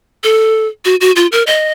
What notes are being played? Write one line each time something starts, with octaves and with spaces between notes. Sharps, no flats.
A4
F#4
F#4
F4
A#4
D#5